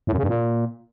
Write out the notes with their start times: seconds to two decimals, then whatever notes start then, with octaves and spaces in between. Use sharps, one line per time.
0.07 A2
0.13 F#2
0.18 C#3
0.23 G2
0.29 A#2